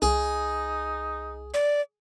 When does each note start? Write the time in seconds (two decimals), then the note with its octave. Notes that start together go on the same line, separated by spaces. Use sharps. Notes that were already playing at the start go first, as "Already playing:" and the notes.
0.02 C2 D#4 G#4
1.54 D5